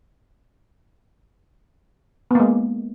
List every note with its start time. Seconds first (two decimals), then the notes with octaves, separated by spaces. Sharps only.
2.31 B3
2.35 A#3
2.40 G#3